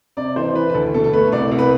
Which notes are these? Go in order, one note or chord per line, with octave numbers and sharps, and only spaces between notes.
C3 D5
E3 C5
E3 B4
B4
D2 A4
B2 A4
A4
A3 B4
C2 D5
C2
B4